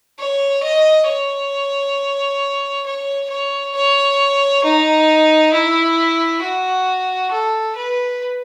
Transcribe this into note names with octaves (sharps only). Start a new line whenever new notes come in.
C#5
D#5
C#5
C#5
C#5
C#5
D#4
E4
F#4
A4
B4